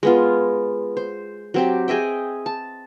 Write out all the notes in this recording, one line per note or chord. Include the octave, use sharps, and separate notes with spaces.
G#3 B3 F4
C5
F#3 C4 G4
G#4 D#5 E5 G5
A5